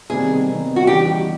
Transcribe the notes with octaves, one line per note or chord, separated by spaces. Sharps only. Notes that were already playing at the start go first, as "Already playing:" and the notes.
C3 D#3 G3 B3 G#4
C3 D#3 G3 B3
F#4
C#3 E3 G3 B3 D#4 G4